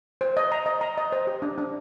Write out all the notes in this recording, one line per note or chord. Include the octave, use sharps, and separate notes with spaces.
C5
D#5
A#5
D#5
A#5
D#5
C5
G4
D4
D4